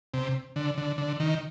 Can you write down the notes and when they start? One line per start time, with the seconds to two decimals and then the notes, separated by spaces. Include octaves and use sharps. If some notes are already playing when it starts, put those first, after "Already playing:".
0.14 C3
0.56 D3
0.78 D3
0.98 D3
1.20 D#3